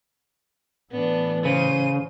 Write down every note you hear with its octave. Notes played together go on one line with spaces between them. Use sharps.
A2 E3 B3 D4
C#3 C5 D#7